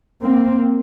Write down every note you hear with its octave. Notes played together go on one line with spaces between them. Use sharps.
A#3 C4